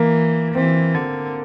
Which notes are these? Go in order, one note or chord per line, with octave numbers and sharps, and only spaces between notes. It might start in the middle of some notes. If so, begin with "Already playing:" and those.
Already playing: E3 A#3
E3 C4
D3